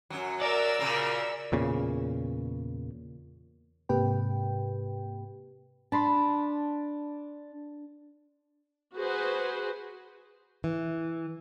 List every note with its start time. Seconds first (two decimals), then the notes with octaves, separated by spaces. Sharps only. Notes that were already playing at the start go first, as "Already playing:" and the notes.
0.10 F#2 F#3
0.41 A#4 D5 E6
0.79 A#2 C#3 A#3
1.52 E2 A#2 C#3
3.89 G#2 C3 A#3 G4 B4 G5
5.92 D4 A5 B5 C6
8.96 F#4 G#4 B4 C5
10.64 E3